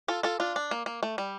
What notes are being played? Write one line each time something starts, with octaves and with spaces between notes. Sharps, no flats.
F4 A4
F4 A4
D4 F4
D4
A#3
A#3
A3
G3